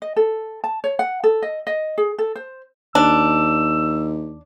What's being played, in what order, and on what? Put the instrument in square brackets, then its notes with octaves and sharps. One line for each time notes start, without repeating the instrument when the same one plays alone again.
[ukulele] D#5
A4
A5
C#5
F#5
A4
D#5
D#5
G#4
A4
C5
[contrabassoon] D#2 [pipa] D4 [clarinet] E6